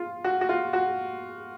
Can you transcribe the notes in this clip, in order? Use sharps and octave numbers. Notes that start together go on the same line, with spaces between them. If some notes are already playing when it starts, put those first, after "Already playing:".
Already playing: F4
F#4
F#4
F4
F#4